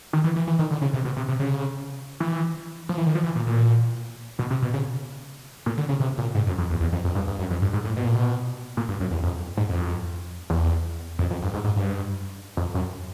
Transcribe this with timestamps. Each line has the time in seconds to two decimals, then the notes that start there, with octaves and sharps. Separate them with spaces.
0.13 D#3
0.24 E3
0.36 E3
0.47 E3
0.59 D#3
0.71 D3
0.82 C#3
0.94 C3
1.05 B2
1.16 C3
1.29 C3
1.40 C#3
2.20 E3
2.89 F3
2.98 E3
3.06 D#3
3.15 F3
3.24 E3
3.35 A#2
3.47 A#2
4.39 B2
4.50 C3
4.62 B2
4.74 C#3
5.66 A#2
5.77 D3
5.89 C#3
6.00 C3
6.18 A#2
6.35 G#2
6.47 F#2
6.58 F2
6.70 E2
6.81 E2
6.92 F2
7.04 F2
7.15 G2
7.28 G2
7.39 F#2
7.50 F2
7.62 G2
7.73 G#2
7.84 A2
7.96 B2
8.05 A#2
8.15 B2
8.77 A#2
8.88 G2
9.00 F#2
9.11 E2
9.23 F2
9.57 G#2
9.69 F2
10.50 E2
11.19 F2
11.30 F2
11.42 G2
11.54 G#2
11.64 G#2
11.76 G2
12.57 F2
12.74 F#2